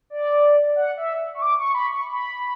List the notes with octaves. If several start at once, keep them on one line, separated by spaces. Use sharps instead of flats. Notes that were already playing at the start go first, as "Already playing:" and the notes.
D5
F#5
E5
C#6
D6
C#6
B5
C#6
B5